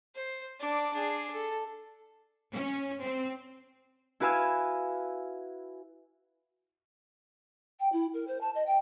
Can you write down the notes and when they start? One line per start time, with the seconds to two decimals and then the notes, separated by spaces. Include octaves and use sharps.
0.15 C5
0.59 D4 D6
0.93 D4 G#4
1.32 A4
2.53 C#4
3.03 C4
4.20 E4 F#4 B4 F5 G#5 E6
7.80 G5
7.93 E4
8.14 A#4
8.28 C5
8.41 A5
8.55 D#5
8.67 G5